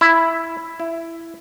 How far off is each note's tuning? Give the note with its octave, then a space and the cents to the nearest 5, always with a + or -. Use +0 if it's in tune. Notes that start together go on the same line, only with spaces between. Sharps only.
E4 +0
E4 +10